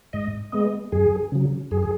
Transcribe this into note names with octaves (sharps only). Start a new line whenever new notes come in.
G#2 D#5
G#3 B3 D#5
F#2 G#4
C#3 F#3
F#2 G#4
G#4